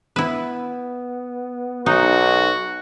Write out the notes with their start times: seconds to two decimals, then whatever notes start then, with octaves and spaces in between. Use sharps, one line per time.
0.16 B3 E4 B4
1.86 B1 D#4 F#4